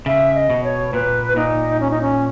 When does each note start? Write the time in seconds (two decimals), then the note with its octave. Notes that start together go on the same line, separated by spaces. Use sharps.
0.06 C#3 E5
0.35 D#5
0.50 B2
0.64 C#5
0.93 A#2 B4
1.36 A#2 D#4
1.80 C#4
1.91 D#4
2.01 C#4